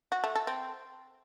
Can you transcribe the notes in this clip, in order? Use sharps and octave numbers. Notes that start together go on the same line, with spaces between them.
F#4
A3
A4
C4